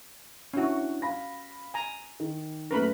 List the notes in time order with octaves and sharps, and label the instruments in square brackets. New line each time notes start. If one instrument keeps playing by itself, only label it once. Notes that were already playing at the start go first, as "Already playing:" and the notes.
[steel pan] C#4 F#4 [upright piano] D4 E4
[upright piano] F5 B5 A#6
[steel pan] G#5 A#5
[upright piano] D#3
[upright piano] F#2 A3 [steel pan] A#4 B4 B5